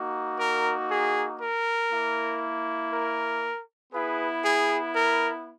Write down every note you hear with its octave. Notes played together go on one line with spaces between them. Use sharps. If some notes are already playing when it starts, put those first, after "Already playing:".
Already playing: A#3 D#4 F#4
A#4
G#4
A#4
A#3 E4
A#4
B3 E4 G#4 B4
G#4
A#4